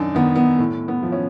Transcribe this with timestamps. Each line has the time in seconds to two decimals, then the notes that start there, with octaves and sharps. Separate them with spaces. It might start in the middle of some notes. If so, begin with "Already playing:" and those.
Already playing: F#2 D#3 D4 D#4
0.15 D#3 B3
0.36 B3
0.58 A2
0.88 B3
1.03 F3
1.12 C#4